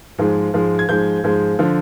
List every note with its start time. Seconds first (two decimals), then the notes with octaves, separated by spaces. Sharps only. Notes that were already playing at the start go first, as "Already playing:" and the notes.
0.18 G#2 F3 G#3
0.54 G#2 F3 G#3
0.79 G#6
0.89 G#2 F3 G#3 G6
1.24 G#2 F3 G#3
1.59 D3 F3